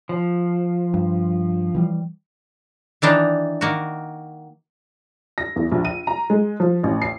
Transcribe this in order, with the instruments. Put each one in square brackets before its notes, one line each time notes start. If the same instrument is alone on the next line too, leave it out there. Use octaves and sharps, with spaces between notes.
[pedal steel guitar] F3
[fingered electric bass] G2
E3 F#3 G3
[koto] D#3 E3 D4 D#4
D#3 A#3 F#4
[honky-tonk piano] A#6
E2
A#1
D#7
A#5
G#3
F3
A1
C7